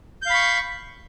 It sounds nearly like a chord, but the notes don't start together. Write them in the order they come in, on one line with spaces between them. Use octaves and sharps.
G6 F5 B5 C#6